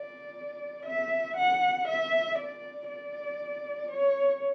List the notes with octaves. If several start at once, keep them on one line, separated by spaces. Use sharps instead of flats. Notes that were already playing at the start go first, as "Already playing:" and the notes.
Already playing: D5
E5
F#5
E5
D5
D5
C#5